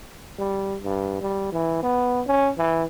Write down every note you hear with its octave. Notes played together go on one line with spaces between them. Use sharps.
G3
G2
G3
E3
B3
C#4
E3